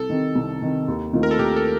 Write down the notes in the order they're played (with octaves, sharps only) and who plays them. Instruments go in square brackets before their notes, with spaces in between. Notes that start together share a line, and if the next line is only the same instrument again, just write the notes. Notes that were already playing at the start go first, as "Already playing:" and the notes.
Already playing: [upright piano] C2 [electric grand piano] A4
[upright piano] C3 D#3
C2
C3 D#3
D#2
D#3 A3 C4 F4
[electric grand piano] A#4
A4
[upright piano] D#2 [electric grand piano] G4
[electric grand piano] A4